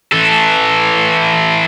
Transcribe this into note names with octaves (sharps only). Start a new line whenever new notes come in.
E3 A4